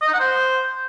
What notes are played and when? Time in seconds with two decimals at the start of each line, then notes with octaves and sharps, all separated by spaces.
0.02 D#5
0.08 D#4
0.14 F#5
0.20 C5